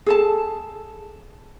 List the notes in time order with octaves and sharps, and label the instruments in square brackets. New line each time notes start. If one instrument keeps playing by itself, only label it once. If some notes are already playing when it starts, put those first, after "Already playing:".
[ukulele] G#4 A4 A5